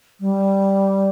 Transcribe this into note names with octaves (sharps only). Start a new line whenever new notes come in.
G3